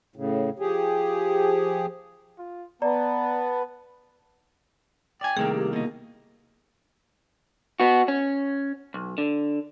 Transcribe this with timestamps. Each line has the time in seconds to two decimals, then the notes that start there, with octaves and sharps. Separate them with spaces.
0.16 A2 C#3
0.59 F3 G4 G#4
2.38 F4
2.82 B3 D5 A5 A#5
5.21 D5 G5 G#5
5.37 C2 D#3 A3 A#3 G#4
5.55 G4
5.73 B2 A#3 D#4
7.80 B3 F#4
8.08 C#4
8.94 B1
9.18 D3